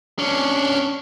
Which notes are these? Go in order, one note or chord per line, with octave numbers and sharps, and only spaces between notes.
C#4 D4